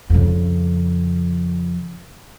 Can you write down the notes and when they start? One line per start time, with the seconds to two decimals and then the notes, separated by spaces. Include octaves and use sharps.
0.10 F2 C#3